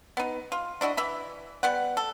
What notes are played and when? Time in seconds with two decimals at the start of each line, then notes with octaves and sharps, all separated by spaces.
0.17 B3 D#4
0.52 F4
0.81 D4 E4 F#4 D#5
0.97 E3 E5 B5
1.63 G3 B3 F#5
1.97 A4